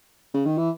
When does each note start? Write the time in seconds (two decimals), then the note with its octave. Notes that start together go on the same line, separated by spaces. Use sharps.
0.34 C#3
0.46 D#3
0.58 E3